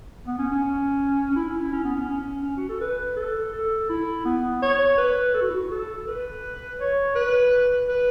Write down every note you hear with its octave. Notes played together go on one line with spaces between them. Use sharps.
B3
C#4
C#4
C#4
E4
C#4
E4
C#4
B3
C#4
C#4
C#4
F#4
A4
B4
A4
A4
E4
B3
C#5
B4
A4
F#4
E4
F#4
A4
B4
C#5
B4
B4